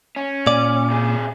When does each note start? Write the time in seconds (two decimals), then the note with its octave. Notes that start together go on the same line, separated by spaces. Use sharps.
0.16 C#4
0.47 A#2 D5
0.90 C3 G#4